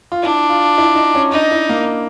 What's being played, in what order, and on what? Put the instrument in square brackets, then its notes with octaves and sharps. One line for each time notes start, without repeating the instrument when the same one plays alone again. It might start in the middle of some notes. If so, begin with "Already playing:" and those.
[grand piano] F4
[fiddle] D4 [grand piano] E4
[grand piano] F4
E4
D#4
C#4
[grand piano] D4 [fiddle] D#4
[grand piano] E4
A#3